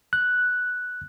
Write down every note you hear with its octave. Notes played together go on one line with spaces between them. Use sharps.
F#6